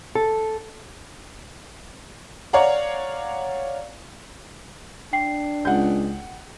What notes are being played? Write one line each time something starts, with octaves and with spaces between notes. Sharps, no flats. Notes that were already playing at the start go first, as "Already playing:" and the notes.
A4
C#5 D5 F5 F#5 A#5
D4 G5 C7
C#2 F#5 G6